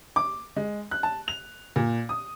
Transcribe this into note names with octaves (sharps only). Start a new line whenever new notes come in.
D6
G#3
F#6
A5
F7
A#2
D#6